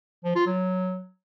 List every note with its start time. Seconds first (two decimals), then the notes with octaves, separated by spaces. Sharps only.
0.24 F3
0.35 F4
0.46 F#3